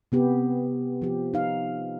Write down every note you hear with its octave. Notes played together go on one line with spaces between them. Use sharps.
C3 B3 G4
F3 G4
D#4 F5